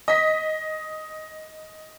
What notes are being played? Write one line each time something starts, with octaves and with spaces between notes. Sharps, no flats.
D#5 B6